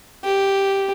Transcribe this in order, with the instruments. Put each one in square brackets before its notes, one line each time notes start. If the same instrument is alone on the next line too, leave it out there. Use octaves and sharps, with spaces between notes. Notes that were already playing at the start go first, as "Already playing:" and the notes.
[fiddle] G4